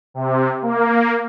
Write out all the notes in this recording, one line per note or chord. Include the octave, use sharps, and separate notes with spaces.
C3
A#3